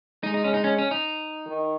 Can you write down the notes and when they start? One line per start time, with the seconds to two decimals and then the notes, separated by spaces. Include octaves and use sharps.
0.23 G#3 D#4
0.34 D#4
0.44 C#4
0.54 D#4
0.64 C#4
0.79 C#4
0.91 D#4
1.47 D#3